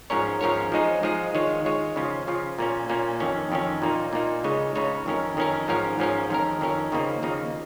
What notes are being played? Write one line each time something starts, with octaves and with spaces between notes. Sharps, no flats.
G#2 F3 C#4 A#4 C#5
G#2 F3 C#4 A#4 C#5
F3 G#3 D#4 G#4
F3 G#3 D#4 G#4
D#3 G#3 F4 C#5
D#3 G#3 F4 C#5
C#3 F3 C#4 F4
C#3 F3 C#4 F4
A#2 A#3 C#4
A#2 A#3 C#4
F2 D#3 C#4
F2 D#3 C#4
A#2 A#3 D#4
A#2 A#3 D#4
C#2 C#3 G#3 D#4 C#5
C#2 C#3 G#3 D#4 C#5
F2 D#3 C#4 A#4
F2 D#3 C#4 A#4
G#2 F3 C#4 A#4
G#2 F3 C#4 A#4
F2 D#3 C#4 A#4
F2 D#3 C#4 A#4
D#2 C#3 F3 A#3 D#4
D#2 C#3 F3 A#3 D#4